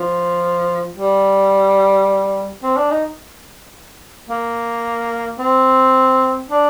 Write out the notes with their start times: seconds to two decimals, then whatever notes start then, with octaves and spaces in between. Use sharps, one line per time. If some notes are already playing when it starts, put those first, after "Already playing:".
Already playing: F3
0.97 G3
2.63 C4
2.77 D4
2.91 D#4
4.29 A#3
5.39 C4
6.51 D4